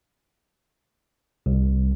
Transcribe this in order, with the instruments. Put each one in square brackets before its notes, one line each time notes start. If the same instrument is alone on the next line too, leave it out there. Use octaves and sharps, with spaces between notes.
[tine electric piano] C2